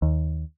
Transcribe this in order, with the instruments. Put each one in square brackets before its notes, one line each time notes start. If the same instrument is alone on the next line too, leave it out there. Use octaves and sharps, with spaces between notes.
[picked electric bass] D#2